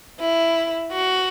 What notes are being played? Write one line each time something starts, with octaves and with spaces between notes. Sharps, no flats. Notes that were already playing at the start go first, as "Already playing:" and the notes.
E4
F#4